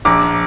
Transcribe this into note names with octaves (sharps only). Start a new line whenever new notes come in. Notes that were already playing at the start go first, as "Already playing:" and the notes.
A#1 A#5 D6